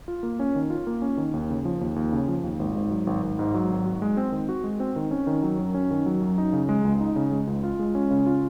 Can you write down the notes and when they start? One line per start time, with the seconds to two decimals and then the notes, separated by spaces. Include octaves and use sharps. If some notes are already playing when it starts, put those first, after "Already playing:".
0.08 F4
0.23 A#3
0.40 C#4
0.56 D#3
0.70 F4
0.87 A#3
1.02 C#4
1.18 D#3
1.33 D#2
1.50 C#3
1.65 F3
1.81 D#2
1.96 D#2
2.12 C#3
2.28 F3
2.44 D#2
2.59 G#1
2.75 G#2
2.91 F#3
3.07 G#1
3.23 G#1
3.39 G#2
3.54 F#3
3.70 G#1
3.86 F#4
4.02 G#3
4.17 C4
4.32 D#3
4.49 F#4
4.64 G#3
4.80 C4
4.96 D#3
5.11 C#4
5.27 D#3
5.43 F#3
5.59 F#2
5.74 C#4
5.91 D#3
6.06 F#3
6.21 F#2
6.38 D#4
6.53 C#3
6.69 G#3
6.85 C#2
7.01 D#4
7.16 C#3
7.32 G#3
7.47 C#2
7.63 F4
7.79 G#3
7.95 C#4
8.11 C#3
8.26 F4